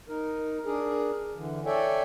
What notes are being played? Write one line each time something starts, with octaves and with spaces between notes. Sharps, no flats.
D#4 A#4
D4 G#4 A#4
D3 E3
A4 C#5 D5 E5 G5 G#5